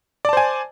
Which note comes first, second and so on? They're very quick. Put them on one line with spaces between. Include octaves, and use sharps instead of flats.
D5 A5 C5 G#5